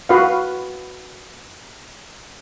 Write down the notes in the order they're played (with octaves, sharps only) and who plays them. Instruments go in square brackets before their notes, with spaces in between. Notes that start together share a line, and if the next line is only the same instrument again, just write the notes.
[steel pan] F#4 B4 F5